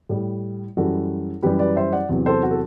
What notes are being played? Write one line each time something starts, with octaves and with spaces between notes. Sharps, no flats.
A2 G3
F#2 E3 G3 F#4 A4
F#2 E3 G3 G4 B4
B4 D5
C5 E5
D5 F#5
E2 C3 F#3
A4 C5
F#4
A4